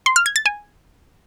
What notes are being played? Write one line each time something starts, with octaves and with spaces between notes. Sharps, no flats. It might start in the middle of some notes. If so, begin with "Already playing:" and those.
C6
F6
G#6
A6
G#5